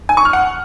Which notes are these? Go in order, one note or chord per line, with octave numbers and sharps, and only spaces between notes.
G#5
C#6
F6
F#5